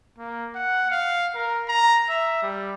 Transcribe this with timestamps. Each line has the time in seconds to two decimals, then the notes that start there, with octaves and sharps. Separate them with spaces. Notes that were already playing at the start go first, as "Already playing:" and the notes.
0.18 A#3
0.55 F#5
0.91 F5
1.35 A#4
1.68 A#5
2.09 E5
2.43 G3